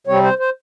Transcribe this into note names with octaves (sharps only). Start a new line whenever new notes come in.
C3 G3 C4 C#5
C5
C5